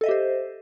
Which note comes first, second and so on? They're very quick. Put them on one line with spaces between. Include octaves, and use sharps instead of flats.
A4 D#5 E5 G4 C5